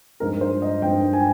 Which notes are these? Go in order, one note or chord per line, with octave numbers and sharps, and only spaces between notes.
G2 F3 G#3 C4 D#4 A#4
C5
D#5
G2 F3 G#3 C4 D#4 G5
G#5